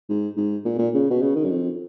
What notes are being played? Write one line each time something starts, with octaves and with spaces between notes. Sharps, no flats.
G#2
G#2
A#2
A#2
C#3
B2
C#3
D#3
F#2
F2